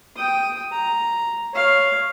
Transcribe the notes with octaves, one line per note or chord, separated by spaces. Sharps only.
G5 D#6
A#5
C#5 F5